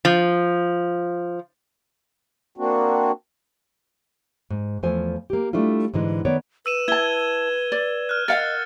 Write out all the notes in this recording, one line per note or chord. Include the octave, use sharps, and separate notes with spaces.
F3
A#3 C4 D4 F#4
G#2
E2 F3 A3 C5 G#5
A#3 G4
G3 A3 D4 E4 F4
G#2 D3 E3 G#3
D#3 B3 C#5 D5
B4 E6 D#7 E7
E4 A5 G#6 G7
D5
F6 F#6
A#4 D#5 F5 F#5 A6 C#7